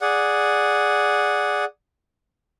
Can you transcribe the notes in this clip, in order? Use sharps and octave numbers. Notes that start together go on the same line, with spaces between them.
G#4 D5 F#5